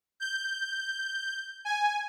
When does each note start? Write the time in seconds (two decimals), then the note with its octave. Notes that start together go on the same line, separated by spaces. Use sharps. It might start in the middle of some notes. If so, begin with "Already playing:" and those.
0.20 G6
1.65 G#5